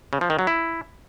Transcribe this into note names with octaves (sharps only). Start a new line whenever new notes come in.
C#3
F3
D#3
F#3
E4